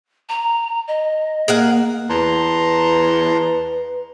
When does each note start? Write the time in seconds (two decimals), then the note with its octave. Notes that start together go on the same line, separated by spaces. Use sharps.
0.29 A#5
0.88 D#5
1.48 A#3 G#4 A#4 F#5
2.10 E2 B4 A5 A#5 C6